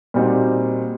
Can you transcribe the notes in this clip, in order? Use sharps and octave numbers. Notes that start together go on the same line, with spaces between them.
A#2 G3 C4 D#4 F#4